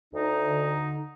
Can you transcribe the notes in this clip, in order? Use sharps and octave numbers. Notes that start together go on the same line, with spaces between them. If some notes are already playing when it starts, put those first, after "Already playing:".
D2 D#4
D3